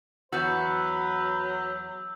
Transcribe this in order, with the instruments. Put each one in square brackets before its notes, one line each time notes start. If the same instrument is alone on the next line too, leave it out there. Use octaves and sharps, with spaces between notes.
[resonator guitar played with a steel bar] E2 B3 F#4 [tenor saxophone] F#3 [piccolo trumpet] B4 [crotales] E6 G6